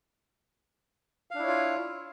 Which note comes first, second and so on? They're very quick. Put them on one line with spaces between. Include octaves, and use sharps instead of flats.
F5 D4 E4 C#5 F4